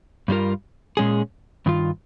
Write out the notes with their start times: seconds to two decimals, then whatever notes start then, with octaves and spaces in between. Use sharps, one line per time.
0.28 G2 G3 C#4 F4 A#4
0.97 A#2 G#3 C#4 G#4
1.66 G2 D#3 F4